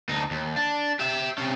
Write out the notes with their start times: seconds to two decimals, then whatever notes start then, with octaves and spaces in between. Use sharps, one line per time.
0.09 D2 D#4
0.31 D#2
0.56 D4
0.99 G4 E5
1.38 C3 C#4